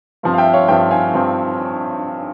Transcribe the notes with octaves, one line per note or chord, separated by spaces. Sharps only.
G2 F3 C4
F5
E5 G5
C#5 F5
G2 F3 C4 E5 G5
F5 G#5
G2 F3 C4